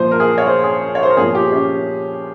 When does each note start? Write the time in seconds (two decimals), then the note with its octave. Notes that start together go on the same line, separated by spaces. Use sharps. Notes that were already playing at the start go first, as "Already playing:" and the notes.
Already playing: A#2 F3 C5
0.11 A#4
0.20 G#4
0.38 C#5
0.47 C5
0.64 G#4
0.95 C#5
1.03 C5
1.10 A#4
1.17 A#2 F3 G#4
1.35 G4
1.53 C#4